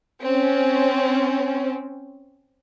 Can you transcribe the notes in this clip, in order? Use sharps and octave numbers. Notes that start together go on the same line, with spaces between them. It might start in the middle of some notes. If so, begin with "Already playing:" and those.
C4 C#4